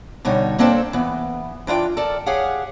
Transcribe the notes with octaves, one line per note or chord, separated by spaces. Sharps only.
B2 D3 G3 D#4 C#5
A#3 C4 D4 A4 C5 G5
E3 B3
E3 D4 F4 G5
A4 A#4 D5 A5
G4 G#4 C#5 F5 F#5